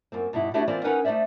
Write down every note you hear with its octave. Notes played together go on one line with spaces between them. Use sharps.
F#2 A#3 C4
G2 B2 D#4 E4
A3 D4 E4 F#4 G4 C#5
E3 A#3 C4 F4 C5 D5
C#4 D#4 A#4 B4 F#5
A3 D#4 C5 D5 E5